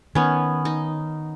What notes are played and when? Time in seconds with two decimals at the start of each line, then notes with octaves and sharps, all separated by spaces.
0.15 D#3 B3 C#4
0.65 D#4